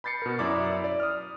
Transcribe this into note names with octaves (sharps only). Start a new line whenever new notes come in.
B5 G6 A6 C7 C#7
B2 A#4
F#2 E4 D5 D6
D5
D#6 F6